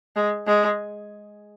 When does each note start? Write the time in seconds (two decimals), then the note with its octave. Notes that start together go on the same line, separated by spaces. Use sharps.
0.16 G#3
0.47 G#3